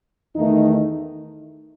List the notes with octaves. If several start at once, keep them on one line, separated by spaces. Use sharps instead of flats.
E2 D#3 A3 D#4